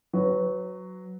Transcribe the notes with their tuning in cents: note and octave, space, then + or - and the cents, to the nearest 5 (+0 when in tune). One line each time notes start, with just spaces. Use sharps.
F#3 +0 B4 +20